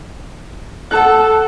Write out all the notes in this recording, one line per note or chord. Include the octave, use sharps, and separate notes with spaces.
A4 F#5 A5 F#6